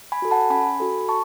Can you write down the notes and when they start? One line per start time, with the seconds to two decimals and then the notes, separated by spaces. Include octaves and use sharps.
0.12 G#5 B5
0.22 F#4 A4
0.31 F#5 A5
0.50 C#4 G#5 B5
0.80 F#4 A4
1.08 A5 C#6